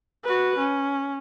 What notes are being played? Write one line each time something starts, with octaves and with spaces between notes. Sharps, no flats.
F#4 B4
C#4